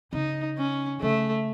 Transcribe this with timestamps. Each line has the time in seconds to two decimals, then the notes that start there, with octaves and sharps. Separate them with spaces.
0.13 C#3 D#4
0.58 C#4
1.01 C#3 A3